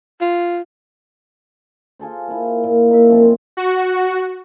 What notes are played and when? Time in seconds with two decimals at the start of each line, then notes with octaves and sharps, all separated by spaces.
0.21 F4
1.99 F4 G#4 A4 C5
2.28 A#3 E4
2.64 A#2
2.88 A#2 D#4 E5
3.08 F#2 F3 C4
3.57 F#4